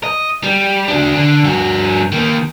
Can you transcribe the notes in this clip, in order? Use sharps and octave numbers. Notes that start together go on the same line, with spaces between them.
D#5
G3
D4 F#4
D3
G2 F#4
D#3 A#3